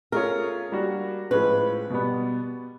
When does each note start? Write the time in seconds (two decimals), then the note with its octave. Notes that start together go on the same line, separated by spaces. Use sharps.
0.12 A3 C#4 F4 G#4 A#4 C#5
0.72 G3 A#3 D4 F#4
1.31 A2 F3 G#3 C#4 B4
1.90 B2 G3 B3